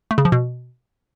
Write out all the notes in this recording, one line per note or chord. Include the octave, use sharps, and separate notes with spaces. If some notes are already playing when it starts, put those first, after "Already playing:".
A3
C#3
F3
B2